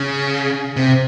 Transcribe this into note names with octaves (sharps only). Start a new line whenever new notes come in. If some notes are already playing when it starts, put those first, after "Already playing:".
Already playing: C#3
C3